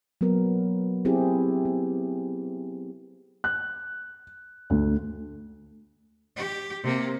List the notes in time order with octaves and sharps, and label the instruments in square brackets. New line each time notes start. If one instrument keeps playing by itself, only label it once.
[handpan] F#3 A#3 B3 A#4
C4 E4 G4 G#4
B3
[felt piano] F#6
D2
[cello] G4
C3 A#3